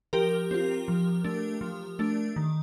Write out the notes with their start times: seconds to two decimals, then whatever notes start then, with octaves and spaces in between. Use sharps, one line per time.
0.13 F3 G4 A#4
0.51 C4 F4
0.88 F3
1.24 A3 D4
1.61 F3
1.99 A3 D4
2.36 D#3